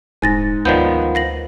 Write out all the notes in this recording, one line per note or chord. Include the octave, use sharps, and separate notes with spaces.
D#1 G#2 G#5 A6 A#6
D2 D#3 F3 B3 D5 G6
F5 A#6 F#7